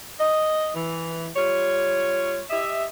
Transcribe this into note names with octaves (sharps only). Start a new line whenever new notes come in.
D#5
E3
G3 F4 C#5
G4 D#5 E5